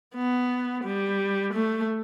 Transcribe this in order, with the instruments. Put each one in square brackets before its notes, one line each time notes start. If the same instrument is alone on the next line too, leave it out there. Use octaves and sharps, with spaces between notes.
[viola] B3
G3
A3